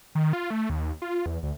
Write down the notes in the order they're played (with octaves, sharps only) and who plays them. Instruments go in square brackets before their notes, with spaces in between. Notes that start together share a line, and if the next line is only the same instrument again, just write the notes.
[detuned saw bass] D#3
F4
A3
D#2
F4
E2
D2